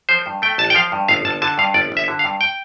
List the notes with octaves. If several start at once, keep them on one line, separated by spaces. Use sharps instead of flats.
F3 C5
G2
A3 G5
A1 A5
G5
F3 F5
G2
G1 F5
G1 A5
D3 A5
G2 F5
G1 D5
G1 E5
D3
F5
G2
G5